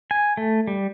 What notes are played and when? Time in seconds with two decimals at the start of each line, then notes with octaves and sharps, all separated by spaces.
0.11 G#5
0.37 A3
0.67 G3